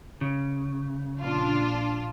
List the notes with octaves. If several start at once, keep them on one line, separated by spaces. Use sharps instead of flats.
C#3
A#1 D4 F4